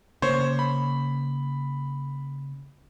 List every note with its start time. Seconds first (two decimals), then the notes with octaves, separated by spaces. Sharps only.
0.22 C#3 A#3 C5 C#5
0.59 B5